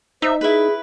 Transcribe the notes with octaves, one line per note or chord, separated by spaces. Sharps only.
D#4 C5 E5
E4 G#4 B4